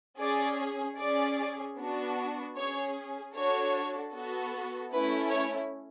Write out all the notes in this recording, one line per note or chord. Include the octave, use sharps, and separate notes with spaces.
C#4 G#4 D5
C#4 G#4 D5
B3 D4 F#4
C#4 G#4 C#5
D4 F#4 A4 C#5
B3 F#4 A4
A3 C#4 E4 B4
C#5